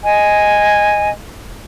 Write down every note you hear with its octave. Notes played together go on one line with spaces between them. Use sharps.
D#5 G#5